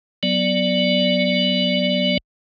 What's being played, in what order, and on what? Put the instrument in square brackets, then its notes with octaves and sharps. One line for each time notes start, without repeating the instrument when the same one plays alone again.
[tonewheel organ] F#3 B3 D5